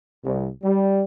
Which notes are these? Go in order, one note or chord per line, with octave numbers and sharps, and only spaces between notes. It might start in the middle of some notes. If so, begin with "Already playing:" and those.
C2
G3